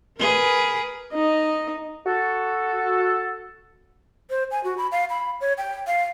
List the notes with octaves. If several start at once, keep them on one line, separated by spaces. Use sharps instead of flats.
G#4 A#4 B4
D#4 D#5
F#4 A4
C5
G#5
F#4
B5
F5
B5
C#5
G5
F5